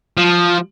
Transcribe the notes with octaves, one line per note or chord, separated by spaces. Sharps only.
F3